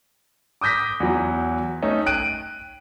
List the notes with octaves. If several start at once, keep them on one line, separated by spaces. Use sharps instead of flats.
D6 D#6 G6 A#6 B6
E2 F#3
A3 C#4 D#4
G5 F#6 D7 D#7